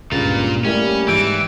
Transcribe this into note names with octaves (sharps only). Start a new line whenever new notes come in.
C#2 G2 A#2 F4
G3 A3 A#3 C#4 E4
G#2 E3 G6 D7